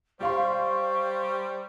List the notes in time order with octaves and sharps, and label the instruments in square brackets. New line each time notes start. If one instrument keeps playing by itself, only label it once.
[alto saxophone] G3 [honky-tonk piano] G4 F5 C6 [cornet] C5 [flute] C#6